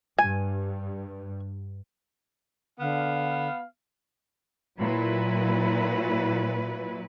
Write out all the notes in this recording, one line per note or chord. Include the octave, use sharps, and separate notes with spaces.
G2 G#5
D3 B3 F5
A#2 F#3 E4 B4